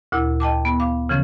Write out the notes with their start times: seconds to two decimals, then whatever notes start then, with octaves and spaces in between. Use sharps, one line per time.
0.12 D2 A#2 E4
0.40 D#5 G5 A5 D6
0.65 B3
0.80 F5 D6
1.09 C#3 E3 F3 C#4